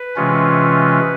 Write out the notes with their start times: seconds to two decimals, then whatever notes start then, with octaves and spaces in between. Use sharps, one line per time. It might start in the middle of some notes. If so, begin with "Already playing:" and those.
Already playing: B4
0.16 C3 E3 G#3 C#4 F4